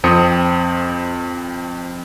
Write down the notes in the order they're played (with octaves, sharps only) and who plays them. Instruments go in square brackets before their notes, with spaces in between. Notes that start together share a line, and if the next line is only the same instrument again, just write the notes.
[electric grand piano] F2 C4 D#6 C#7